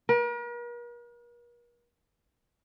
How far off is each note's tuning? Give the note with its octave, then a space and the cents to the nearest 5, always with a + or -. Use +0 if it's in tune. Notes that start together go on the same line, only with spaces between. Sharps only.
A#4 +45